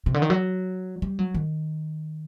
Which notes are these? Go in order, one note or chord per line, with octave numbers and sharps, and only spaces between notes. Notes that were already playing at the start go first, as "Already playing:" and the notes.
C3
D3
D#3
F#3
G3
F#3
D#3